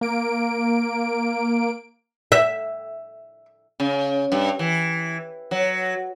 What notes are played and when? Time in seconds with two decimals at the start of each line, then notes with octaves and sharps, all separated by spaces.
0.01 A#3 D7
2.32 E5
3.80 C#3
4.32 G2
4.59 E3
5.51 F#3